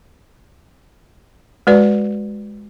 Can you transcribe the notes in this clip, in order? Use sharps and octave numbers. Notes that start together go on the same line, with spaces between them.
G#3 F#4 B4 D5